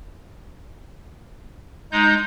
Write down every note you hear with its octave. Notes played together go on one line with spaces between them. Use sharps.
G#3 D#4 G6